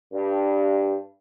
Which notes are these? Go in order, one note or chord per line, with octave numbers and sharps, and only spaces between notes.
G2